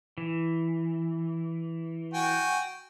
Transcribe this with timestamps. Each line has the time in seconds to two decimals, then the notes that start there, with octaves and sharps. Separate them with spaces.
0.18 E3
2.14 F#4 G5 G#5